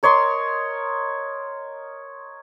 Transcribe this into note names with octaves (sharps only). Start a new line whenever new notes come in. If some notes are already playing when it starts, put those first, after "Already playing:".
A#4 C#5 D#5 C6